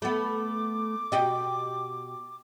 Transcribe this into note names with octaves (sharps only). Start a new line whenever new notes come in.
A3 B3 D6
B2 G4 D#5